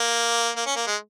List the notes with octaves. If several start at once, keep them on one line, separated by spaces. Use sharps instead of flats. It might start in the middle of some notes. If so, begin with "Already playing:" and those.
Already playing: A#3
A#3
C#4
A#3
G#3